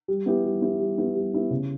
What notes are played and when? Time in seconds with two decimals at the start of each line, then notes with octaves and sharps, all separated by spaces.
0.08 G3
0.26 B3 E4 G4
0.44 G3
0.62 B3 E4 G4
0.80 G3
0.98 B3 E4 G4
1.15 G3
1.33 B3 E4 G4
1.51 C#3